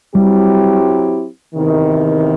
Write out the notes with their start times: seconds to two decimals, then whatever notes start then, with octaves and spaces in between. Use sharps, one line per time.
0.15 F#3 G3 C4 E4 G4
1.55 E2 C3 D#3